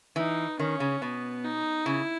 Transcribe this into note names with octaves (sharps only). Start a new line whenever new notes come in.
E3 D#4
D#3 C#4
C#3
B2 B3
D#4
C#3 E4